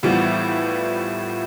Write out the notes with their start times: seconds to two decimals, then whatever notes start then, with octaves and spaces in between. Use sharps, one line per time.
0.03 A2 E3 F3 G3 B3